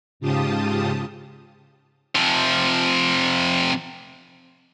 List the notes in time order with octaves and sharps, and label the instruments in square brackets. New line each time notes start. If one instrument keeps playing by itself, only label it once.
[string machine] G#2 C#3 F4 G4 A5 D#6
[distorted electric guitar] C3 F3